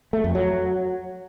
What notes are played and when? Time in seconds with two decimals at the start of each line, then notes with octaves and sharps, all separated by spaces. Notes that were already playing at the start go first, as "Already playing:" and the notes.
0.13 A3
0.24 F2
0.35 F#3